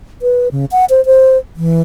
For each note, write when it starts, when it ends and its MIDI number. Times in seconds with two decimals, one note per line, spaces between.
0.22 0.48 71
0.51 0.65 49
0.71 0.85 78
0.90 1.04 72
1.05 1.37 72
1.56 1.82 52